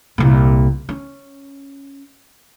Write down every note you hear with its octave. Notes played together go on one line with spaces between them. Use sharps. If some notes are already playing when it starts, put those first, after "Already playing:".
C2 A#2
C#4